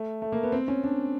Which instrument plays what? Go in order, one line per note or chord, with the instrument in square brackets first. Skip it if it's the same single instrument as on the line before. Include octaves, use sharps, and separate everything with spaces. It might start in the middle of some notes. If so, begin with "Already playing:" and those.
Already playing: [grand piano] A3
A3
A#3
B3
C4
C#4
D4